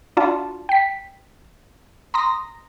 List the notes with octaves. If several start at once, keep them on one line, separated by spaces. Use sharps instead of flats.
D4 F4 F#4 D5 A5
G5 B6
A#5 C6 D#6 A#6